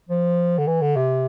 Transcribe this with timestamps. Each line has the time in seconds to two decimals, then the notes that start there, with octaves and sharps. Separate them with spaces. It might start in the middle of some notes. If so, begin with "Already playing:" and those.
0.09 F3
0.58 D3
0.67 E3
0.81 D3
0.96 C3